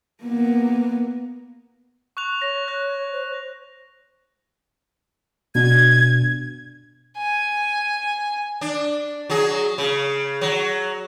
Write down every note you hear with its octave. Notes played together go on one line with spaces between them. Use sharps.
A#3 B3
C#6 F#6 F7
C#5 A#6
F#6 A#6
C5
B2 D4 G#6
G#5
D4
F#3 G#4
C#3
F#3